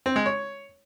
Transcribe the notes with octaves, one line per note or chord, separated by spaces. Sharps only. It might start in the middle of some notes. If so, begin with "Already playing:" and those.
C4
G#3
C#5